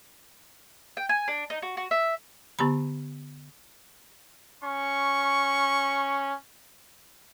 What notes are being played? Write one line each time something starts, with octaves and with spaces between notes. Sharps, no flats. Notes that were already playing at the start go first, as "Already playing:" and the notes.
G5
G#5
D4
D#4
F#4
F#4
E5
D3 B3 G4 A#5 B5
C#4 C#6